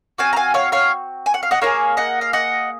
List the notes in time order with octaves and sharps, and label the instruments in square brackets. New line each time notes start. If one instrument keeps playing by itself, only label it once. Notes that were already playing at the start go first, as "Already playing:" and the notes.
[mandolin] C4 F#4 F5 G#5
A#5
F5 G#5
C#5 F5
C#5 F5
G#5
F#5
F5
D#5 F#5
A#3 F4 G#4 C#5 F5
D#5 F#5
F5
D#5 F#5